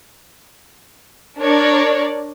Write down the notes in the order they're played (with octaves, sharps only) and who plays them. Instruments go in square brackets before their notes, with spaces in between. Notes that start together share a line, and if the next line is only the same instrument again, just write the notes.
[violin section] D4 A#4 C#5 D5